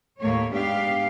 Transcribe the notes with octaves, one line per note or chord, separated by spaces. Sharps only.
D#2 A2 A3 A#3 C#5
G#2 B3 D4 G4 F5